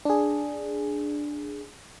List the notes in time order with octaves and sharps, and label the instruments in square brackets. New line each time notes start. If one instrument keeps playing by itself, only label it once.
[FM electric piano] D4 G#4